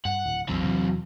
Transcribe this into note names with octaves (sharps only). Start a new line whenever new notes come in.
G2 F#5
D1
A1 E2 F#3 C4
E2 C3 E3